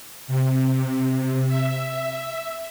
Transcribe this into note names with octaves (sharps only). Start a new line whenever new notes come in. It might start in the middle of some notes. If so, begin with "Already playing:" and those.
C3
E5